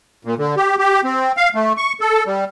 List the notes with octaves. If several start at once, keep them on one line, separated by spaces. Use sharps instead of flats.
A#2
D3
G4
G4
C4
F5
A3
C#6
A4
G3